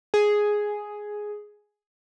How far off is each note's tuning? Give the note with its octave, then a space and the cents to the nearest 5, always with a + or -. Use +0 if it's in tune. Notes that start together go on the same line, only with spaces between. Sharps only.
G#4 +5